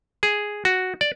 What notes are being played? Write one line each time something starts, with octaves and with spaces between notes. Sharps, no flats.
G#4
F#4
D5